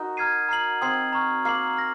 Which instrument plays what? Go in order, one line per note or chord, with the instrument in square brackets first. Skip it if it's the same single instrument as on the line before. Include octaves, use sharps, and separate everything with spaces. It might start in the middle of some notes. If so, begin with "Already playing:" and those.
Already playing: [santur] D#4 F#4 A#4
[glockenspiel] A#5 F6 G#6 C7 D#7
A#5 F6 C7 F#7
[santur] C4 [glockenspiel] D#6 G#6 C7 F#7
[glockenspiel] A#5 C#6 F6
[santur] A#3 [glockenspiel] F6 C7 F#7
[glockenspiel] F6 A#6